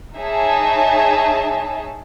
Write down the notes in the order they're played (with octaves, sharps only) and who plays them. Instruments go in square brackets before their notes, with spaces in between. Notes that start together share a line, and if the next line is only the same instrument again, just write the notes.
[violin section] D#4 G#4 C#5 E5 A5